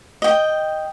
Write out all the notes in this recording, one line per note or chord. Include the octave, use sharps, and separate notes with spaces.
D#5 G5